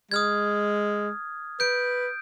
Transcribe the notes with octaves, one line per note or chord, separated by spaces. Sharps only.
G#3 D#6 F6 G#6
B4 G6 D7